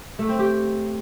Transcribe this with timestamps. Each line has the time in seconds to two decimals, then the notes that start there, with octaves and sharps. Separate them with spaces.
0.19 A3
0.29 C4
0.39 G4